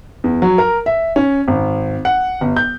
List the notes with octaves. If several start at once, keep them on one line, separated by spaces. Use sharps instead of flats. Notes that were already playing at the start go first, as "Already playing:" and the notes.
E2
F#3
A#4
E5
C#4
G#1
F#5
G1
G6